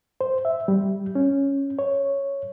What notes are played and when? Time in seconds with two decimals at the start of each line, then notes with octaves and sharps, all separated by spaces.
0.21 C5
0.45 E5
0.68 G3
1.15 C#4
1.79 C#5